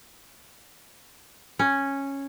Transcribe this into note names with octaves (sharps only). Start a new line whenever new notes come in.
C#4